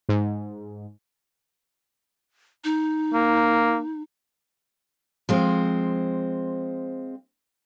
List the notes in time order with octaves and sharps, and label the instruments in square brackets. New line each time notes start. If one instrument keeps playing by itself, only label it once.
[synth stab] G#2
[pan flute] D#4
[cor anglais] A#3
[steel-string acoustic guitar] F3 G#3 C4